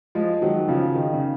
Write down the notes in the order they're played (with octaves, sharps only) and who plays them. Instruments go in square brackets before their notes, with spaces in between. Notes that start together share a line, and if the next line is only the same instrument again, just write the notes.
[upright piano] F3 G#3
D#3 F#3
C#3 F3
D#3
C#3